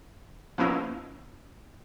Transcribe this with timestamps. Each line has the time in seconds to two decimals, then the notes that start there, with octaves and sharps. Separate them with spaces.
0.58 F3 A#3 B3 C#4 D#4 E4